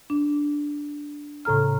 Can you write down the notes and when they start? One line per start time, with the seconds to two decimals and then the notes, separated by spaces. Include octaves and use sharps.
0.10 D4
1.45 A2 C#3 A4 A#5 F6